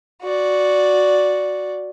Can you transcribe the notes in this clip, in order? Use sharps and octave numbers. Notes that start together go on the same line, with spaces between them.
F#4 D5